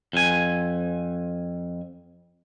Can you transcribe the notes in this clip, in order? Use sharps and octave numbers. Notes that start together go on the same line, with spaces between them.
F2 G#5